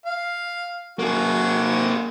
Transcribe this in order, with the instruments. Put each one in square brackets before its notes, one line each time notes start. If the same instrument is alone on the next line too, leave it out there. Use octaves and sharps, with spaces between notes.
[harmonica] F5
[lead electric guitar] A#3 G#4 [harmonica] F#4